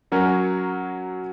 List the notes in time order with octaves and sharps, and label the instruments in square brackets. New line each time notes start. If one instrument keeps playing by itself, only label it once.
[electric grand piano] F#3 C#4 F#4 A#4 C#5